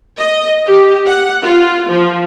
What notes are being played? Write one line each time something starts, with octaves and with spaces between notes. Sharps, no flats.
D#5
G4
F#5
F4
F3